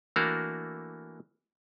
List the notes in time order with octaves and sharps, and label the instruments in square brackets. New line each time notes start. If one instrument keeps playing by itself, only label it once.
[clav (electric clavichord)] E3 A3 A#3 D4 F#4 A#4